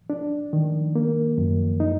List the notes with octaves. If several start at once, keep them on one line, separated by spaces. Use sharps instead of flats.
D4
D#3
A#3
F#2
D#4